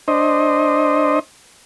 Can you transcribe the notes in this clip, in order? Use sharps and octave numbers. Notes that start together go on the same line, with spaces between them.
D4 C5 D#5